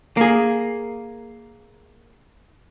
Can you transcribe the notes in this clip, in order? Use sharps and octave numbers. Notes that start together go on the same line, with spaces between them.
A#3 G#4